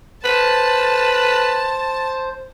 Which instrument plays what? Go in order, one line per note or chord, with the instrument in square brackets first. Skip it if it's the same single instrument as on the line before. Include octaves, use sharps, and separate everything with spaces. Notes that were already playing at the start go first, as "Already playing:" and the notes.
[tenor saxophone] B4 [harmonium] C5 [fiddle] A5